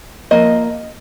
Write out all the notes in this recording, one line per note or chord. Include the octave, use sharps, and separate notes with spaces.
F3 A#3 D#5